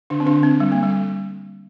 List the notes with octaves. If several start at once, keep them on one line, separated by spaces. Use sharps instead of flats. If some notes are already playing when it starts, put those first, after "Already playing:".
D3 D4
C4
D3 D4
C4
G3
A#3
G3